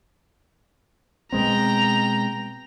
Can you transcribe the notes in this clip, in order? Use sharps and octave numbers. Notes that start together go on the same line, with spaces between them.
B2 G#3 C4 G5 A#5